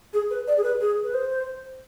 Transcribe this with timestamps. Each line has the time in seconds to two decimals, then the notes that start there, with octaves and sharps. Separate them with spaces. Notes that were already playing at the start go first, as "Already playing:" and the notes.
0.13 G#4
0.30 B4
0.47 D5
0.57 G#4
0.64 B4
0.81 G#4
1.04 B4
1.14 C5